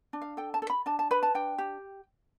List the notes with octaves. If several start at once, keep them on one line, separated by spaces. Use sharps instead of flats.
D4
F5
A4 G5
A5
A4
B5
D4 A5
A5
B4 B5
A5
D4 G5
G4